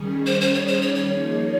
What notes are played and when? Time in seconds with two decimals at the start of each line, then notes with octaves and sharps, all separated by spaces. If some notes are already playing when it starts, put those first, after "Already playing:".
Already playing: D#3 G3 C#4 G#4
0.26 C5
0.41 C5
0.54 C#5
0.67 C5
0.82 C#5
0.95 C#5
1.08 F3 A#3 D#4 G#4